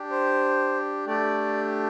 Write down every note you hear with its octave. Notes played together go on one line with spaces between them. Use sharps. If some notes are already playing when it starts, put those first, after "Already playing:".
Already playing: D4 G4
C5
A3 D4 G4 D5